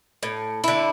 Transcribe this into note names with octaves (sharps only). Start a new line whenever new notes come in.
A2
D3 E4